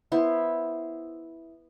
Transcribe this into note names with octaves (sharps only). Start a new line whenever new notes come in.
B3 E4 C5